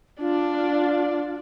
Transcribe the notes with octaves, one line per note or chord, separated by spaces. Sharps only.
D4 F4 D5